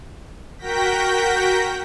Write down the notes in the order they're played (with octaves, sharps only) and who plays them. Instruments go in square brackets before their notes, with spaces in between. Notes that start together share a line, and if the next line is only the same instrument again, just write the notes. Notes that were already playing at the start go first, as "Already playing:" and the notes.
[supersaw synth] F#4 A#4 G5 G6 A#6 B6